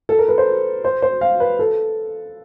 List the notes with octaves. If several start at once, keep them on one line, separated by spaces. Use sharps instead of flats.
A4
A#4
B4
C5
C5
C5
F5
B4
A4